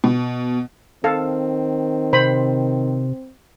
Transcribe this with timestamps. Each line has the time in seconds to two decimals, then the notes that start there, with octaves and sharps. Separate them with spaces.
0.04 B2
1.04 D#3 C4 A4 F5
2.13 C3 C5 B5